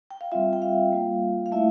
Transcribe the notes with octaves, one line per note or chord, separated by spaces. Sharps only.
G5
F5
G3 C4 F4 E5
G5
F5
G3 A#3 F4
F5
A3 E4 E5